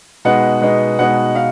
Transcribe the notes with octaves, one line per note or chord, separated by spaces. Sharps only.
B2 G#3 B3 D#4 F#5
B2 G#3 B3 D#4
B2 G#3 B3 D#4 F#5
D#4 F5